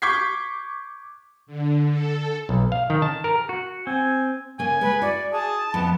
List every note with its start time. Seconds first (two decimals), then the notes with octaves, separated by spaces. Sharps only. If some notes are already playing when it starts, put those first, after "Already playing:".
0.02 C#6 D6 G6 G#6 B6 C7
1.46 D3
1.90 A4
2.49 B1
2.72 F5
2.90 D#3
3.02 A5
3.24 A#4
3.49 F#4
3.87 C4 G#5
4.59 C#3 A#3 G#5
4.81 G#3 B4
5.01 E4 F#4 D5
5.32 G#4 A5
5.74 F2 A2 B3